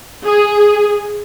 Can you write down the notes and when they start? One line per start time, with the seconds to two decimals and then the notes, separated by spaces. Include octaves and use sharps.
0.25 G#4